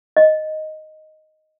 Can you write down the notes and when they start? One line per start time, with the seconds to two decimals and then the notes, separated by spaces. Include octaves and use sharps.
0.17 D#5